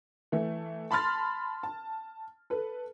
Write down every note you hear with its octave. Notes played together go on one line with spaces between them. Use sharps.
E3 A3
A5 B5 C6 F6 A6
A5
A4 B4